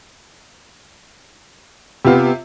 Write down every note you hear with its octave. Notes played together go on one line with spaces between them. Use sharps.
C3 B3 F4 G4